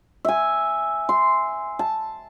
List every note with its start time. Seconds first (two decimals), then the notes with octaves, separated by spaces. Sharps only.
0.25 E5 G#5
1.09 C6
1.79 A5